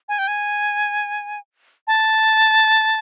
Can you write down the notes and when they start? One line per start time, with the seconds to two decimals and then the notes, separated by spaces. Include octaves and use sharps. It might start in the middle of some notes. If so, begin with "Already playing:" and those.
0.09 G#5
0.19 G5
0.28 G#5
1.87 A5